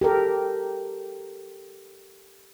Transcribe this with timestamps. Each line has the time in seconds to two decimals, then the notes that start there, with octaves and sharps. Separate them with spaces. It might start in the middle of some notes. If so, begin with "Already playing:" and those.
0.01 G4 A4 A#4